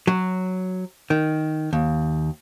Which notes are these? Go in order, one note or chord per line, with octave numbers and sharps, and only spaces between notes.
F#3
D#3
D#2